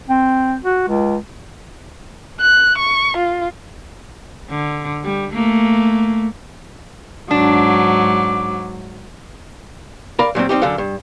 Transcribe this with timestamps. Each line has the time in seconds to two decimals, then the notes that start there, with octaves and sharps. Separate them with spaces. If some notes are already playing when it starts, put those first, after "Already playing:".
0.08 C4
0.64 F#4
0.88 C#2
2.41 F#6
2.78 C#6
3.17 F4
4.50 D3
5.04 G3
5.33 A3 A#3
7.31 G#2 F#3 D4 D6
10.19 A#4 D5 F5 A#5 B5
10.35 A#2 F#3 G3 C4
10.49 G3 C4 D#4 G4
10.62 F#2 D3 A4 F5
10.78 G2